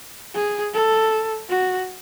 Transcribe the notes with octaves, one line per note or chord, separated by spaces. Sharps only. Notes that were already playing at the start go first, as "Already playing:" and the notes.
G#4
A4
F#4